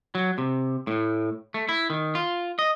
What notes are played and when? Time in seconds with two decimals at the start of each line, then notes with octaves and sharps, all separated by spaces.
0.15 F#3
0.38 C3
0.87 A2
1.54 A3
1.69 E4
1.90 D#3
2.15 F4
2.59 D#5